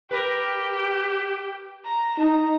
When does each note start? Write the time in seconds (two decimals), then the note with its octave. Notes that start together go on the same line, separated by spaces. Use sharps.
0.11 G4 A#4 B4
1.85 A#5
2.18 D#4 A#5